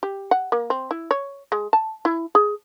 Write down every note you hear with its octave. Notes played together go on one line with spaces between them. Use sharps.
G4
F#5
A#3
C4
E4
C#5
G#3
A5
E4
G#4